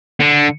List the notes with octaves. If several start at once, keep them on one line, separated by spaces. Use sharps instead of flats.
D3